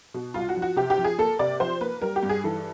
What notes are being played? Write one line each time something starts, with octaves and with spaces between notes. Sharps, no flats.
B2
C2 F4
F#4
F3
F#4
C3 G4
G4
F3
G#4
A#3 A4
C3 D5
F3 C5
A#3 B4
G3 A#4
G4
G2
G#4
E3 A4